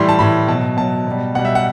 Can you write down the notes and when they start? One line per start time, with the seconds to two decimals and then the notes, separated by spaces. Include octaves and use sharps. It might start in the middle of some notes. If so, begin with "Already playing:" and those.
Already playing: A2 E3 G3 C6
0.09 A5
0.19 A2 E3 G3 B5
0.48 B2 F#3 A5
0.77 B2 F#3 A5
1.07 B2 G3
1.35 B2 G3 F#5
1.45 E5
1.55 F#5